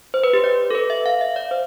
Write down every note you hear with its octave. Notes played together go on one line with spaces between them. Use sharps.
C5
B4
G4
D5
A4
B4
E5
F5
E5
D5
C5